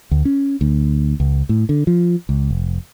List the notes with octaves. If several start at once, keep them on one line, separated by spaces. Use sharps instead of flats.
D2
C#4
D2
C#2
A2
D3
F3
C#2
F1